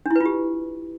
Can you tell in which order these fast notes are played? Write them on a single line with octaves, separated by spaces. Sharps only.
D4 E4 B4 F4 G4